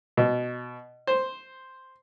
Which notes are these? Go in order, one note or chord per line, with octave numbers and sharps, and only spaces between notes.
B2
C5